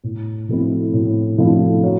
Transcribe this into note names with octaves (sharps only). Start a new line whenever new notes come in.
A2
F3 A3 C4 E4
A2
F3 A3 C4 E4
F#3